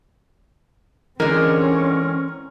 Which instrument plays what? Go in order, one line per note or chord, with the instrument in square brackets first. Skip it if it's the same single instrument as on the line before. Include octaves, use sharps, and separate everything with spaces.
[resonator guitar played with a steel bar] D3 G#3 [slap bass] E3 [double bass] C4 C#4 [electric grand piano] A#4